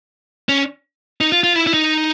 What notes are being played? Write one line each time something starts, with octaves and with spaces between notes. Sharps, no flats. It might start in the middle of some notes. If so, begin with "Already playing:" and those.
C#4
D#4
F4
F4
E4
E4
D#4